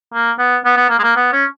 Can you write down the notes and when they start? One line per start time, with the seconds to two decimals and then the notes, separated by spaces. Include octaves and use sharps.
0.14 A#3
0.39 B3
0.65 B3
0.77 B3
0.90 A#3
0.99 G#3
1.03 A#3
1.16 B3
1.33 C#4